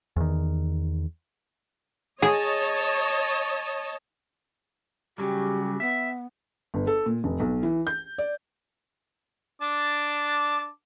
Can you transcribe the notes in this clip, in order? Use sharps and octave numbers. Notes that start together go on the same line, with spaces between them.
E2 D#3
G#4 C#5 D#5 A5
C#3 F#3 G3 G4
B3 E5
G1
A4
A#2
F1
B1
E3
G6
D5
D4 A5 D6